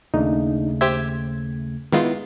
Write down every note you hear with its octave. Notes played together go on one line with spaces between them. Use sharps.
D#2 C#3 A3 D4 D#4
G4 C5 E5 G#6
D#3 G#3 B3 E4 F4